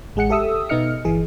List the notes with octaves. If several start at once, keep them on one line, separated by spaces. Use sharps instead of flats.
A1 G#3 G#4 F#5 C#7
G4 A4 E5 D#6 E6
B2 B3 D#4 D#5 F6 C#7
G1 E3 G#4